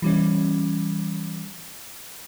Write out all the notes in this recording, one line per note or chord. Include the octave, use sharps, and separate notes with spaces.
E3 G3 C#4